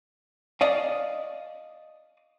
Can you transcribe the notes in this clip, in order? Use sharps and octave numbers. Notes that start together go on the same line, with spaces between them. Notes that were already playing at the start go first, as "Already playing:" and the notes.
D5 D#5 F5